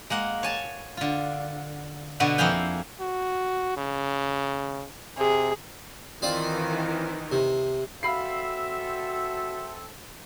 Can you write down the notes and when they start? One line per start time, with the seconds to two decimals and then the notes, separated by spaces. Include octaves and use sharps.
0.10 G#3 A#3 F#5
0.43 C#5 G#5 A5
0.97 D3 F4
2.20 B2 D3 B3 F#4 B4
2.38 F2 A#3 E4 G#4 F5 G5
3.00 F#4
3.77 C#3
5.18 C3 G#4
6.22 D#3 E3 C4 F4 D5
7.32 C3
8.03 C4 F#4 A4 E5 F5 B5 C7